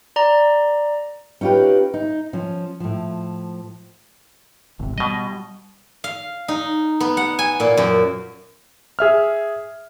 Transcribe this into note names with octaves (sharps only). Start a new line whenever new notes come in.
D5 A#5
C#4 D#4 F4 G4 B4
D#4
F3 C#4
A2 F3
G#1 C3
B2 G3 D#5
F5
D#4
B3
F#5
G#5
A#2
F#2
G#4 E5 F6